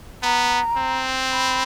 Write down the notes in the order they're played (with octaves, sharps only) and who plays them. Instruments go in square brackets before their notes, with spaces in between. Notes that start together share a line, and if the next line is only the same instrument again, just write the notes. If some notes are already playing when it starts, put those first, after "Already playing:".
[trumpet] B3 [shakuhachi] A#5
[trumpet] C4
[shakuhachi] B5